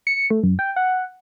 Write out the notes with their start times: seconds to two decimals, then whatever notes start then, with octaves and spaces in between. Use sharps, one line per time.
0.07 C#7
0.31 A3
0.44 F#2
0.59 G5
0.76 F#5